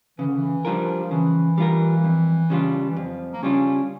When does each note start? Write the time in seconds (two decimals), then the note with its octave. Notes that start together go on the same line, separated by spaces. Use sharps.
0.19 C#3 E3
0.27 D3
0.35 E3
0.65 F3 G3 D4 F4 A#4
1.11 C#3 E3
1.58 G3 D4 F4 A#4
2.04 F2
2.50 C#3 G3 D4 F4
2.87 E3
2.96 F2 F3
3.32 A#3
3.43 C#3 G3 C#4 D4 F4